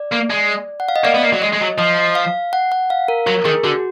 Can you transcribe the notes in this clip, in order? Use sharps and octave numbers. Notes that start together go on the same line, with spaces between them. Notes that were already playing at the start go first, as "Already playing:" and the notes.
Already playing: D5
A#3
G#3
F#5
F5
D#5
A#3 D5
B3
A#3
F#3
G#3 D#5
G#3
F#3
F3 D#5
F5
F#5
F#5
F5
A#4
F#3 A#4
D#3 G#4
D3 F#4